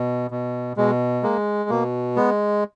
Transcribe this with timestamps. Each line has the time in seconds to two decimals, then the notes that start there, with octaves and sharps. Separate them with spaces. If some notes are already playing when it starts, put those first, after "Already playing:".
Already playing: B2
0.31 B2
0.77 B2 G#3
1.23 G#3 A#3
1.70 B2 A#3
2.16 G#3 B3